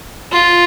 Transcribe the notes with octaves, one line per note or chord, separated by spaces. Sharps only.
F4